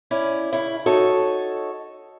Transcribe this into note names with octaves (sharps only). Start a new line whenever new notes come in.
C#4 E4 D5
C#3 E4
D#4 F#4 A4 C#5